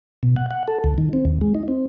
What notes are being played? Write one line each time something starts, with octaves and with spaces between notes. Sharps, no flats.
B2
F#5
F#5
A4
D2
D#3
C4
D#2
G#3
D#4
C4